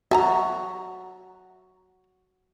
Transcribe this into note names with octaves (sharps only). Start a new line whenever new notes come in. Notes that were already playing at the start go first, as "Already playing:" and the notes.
F#4 E5 A5 A#5